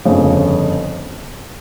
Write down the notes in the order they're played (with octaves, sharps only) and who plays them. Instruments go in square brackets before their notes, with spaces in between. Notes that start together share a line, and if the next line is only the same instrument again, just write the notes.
[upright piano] G1 F2 C#3